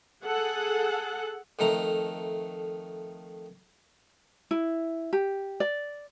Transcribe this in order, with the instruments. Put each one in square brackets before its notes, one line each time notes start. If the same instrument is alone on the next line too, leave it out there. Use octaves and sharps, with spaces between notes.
[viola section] G#4 A4 F#5
[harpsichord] F2 D#3 A3 A#5
[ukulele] E4
G4
D5